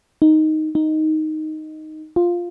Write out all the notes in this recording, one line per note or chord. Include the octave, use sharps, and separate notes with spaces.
D#4
D#4
F4